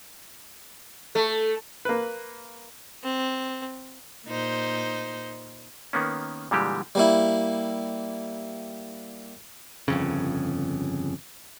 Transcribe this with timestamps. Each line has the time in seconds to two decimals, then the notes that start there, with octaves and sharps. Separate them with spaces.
1.15 A3 A4
1.85 A#3 B4
3.03 C4
4.26 A#2 D#4 C5
5.93 D#3 A#3 B3 C#4
6.51 A#2 D3 E3 G3 G#3 G4
6.95 G3 A#3 E4
9.88 G1 F2 C#3